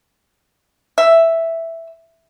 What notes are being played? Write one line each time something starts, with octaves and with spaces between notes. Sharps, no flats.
E5